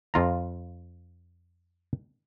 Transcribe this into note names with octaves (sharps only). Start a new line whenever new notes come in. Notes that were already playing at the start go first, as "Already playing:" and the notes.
F2 F4 A#5